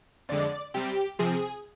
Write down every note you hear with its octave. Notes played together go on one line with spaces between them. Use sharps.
F2 D3 G#3 D5
C3 G3 C4 G4
C3 F3 C4 G#4